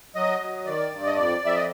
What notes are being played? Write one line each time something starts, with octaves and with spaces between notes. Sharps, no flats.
F#3 D#5
F#3
D#3 D5
G2
D#5
F2 D5
F2
E5
D#5